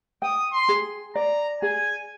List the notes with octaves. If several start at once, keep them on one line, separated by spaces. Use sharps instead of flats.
G5 D#6
C6
G#4
D5 A#5
G#4 G#5